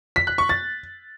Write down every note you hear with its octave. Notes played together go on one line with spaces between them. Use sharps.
B6
F#6
C#6
A6